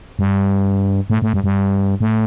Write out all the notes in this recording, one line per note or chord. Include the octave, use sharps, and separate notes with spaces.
G2
A2
A2
G2
G2
A2